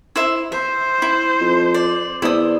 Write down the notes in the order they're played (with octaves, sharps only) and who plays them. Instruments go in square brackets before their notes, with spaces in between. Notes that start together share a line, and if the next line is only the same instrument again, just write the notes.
[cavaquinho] E4 C5 E5
[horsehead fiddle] C5 [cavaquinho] E5
[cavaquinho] E4
[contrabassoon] F2
[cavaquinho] D5
[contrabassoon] E2 [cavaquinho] E4 D#6 [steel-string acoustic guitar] C5 D5